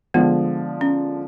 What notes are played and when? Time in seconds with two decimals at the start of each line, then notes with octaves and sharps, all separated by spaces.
0.14 D3 F3 G#3 B3
0.81 C#4